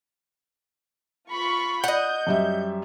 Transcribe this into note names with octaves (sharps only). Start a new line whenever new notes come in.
F4 B5 C#6
D#5 F#5 G6
F#2 G3 E5